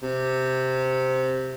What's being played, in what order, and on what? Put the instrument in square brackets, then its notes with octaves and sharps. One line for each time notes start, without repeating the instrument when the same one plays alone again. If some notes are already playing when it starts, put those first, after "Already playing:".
[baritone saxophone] C3